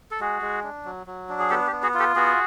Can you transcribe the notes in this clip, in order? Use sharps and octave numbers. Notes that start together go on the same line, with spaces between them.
A4
G#3 F#4 G#4
G#3
D4
F#3
F#3
D4
G#4
B3 G4 A4
G4
B3
F#4 G#4
F4
G4 A4
B3 F#4 G#4